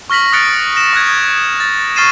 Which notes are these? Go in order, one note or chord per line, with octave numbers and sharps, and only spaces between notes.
C#6 F6 A#6 B6 F#7
D#6 F6 F#6 A6 C#7 D7
A#6 E7
C#6 D#6 F#6 G#6
A6
C#6 F6 A6 C7 D#7 E7